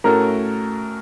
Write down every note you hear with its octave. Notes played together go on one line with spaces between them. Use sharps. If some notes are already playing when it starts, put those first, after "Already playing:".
A2 A3 C#4 F#4 A4 A#4